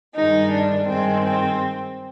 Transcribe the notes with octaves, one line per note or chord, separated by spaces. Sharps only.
G2 D#3 G#3 D#4
D4
G2 D#3 G#3 C4
C4